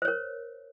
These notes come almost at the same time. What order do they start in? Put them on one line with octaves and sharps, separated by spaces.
C5 C#5 A#4